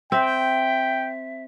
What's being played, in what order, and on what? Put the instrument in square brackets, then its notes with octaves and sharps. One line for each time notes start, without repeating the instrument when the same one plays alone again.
[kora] C4 [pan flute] E5 [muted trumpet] G5